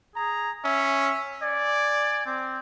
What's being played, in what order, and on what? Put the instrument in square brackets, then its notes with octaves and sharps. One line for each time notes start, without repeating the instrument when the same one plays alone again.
[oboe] G#4 [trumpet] A#5
[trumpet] C#4 [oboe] E5
[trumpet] D5 [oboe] G#5
[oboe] C4